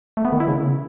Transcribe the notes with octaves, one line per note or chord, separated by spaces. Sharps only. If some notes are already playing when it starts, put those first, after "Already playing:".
A3
B3
D#3
E4
C#3